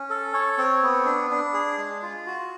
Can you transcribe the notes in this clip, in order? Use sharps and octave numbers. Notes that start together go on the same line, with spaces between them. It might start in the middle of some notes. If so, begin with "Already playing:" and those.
Already playing: C#4
A4
C#5
C4
B3
D4
D4
G#4
G#3
F4
F#4